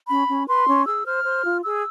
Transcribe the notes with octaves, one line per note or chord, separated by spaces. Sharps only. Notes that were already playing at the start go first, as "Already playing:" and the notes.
C#4 B5
C#4
B4 C6
C#4
G#4 E6
C5 F6
C5
F4
G#4 E6